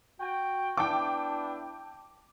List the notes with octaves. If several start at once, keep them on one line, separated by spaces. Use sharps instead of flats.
F#4 G5
B3 D4 E4 G5 A5 D6